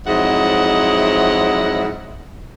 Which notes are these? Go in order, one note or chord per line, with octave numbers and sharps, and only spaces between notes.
F2 G#2 F#3 E4 D#5 F#5